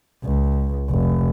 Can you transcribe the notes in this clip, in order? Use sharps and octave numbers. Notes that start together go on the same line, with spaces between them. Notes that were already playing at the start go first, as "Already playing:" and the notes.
C#2
F1